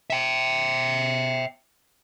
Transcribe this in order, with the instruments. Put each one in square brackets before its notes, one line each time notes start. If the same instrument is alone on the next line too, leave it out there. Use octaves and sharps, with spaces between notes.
[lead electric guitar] E5 G5